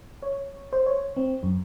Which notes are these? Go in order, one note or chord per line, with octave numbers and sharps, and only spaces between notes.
C#5
C5
C#5
C4
F#2